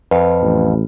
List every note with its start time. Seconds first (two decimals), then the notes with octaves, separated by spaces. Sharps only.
0.11 F2 B4
0.42 A1